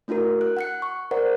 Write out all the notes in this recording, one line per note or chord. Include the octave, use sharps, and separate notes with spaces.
A3 D4 E4 F#4 A#4
F#6
F#5 F#6 C#7
C#6
A#4 C5 D5 F#5